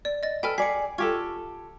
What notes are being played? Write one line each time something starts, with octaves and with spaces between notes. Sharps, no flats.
D5
D#5 A6
A4 B4 G5 G#5 F6
G#4 D5 B6 C#7
F4 G4 A4 C#6 G#6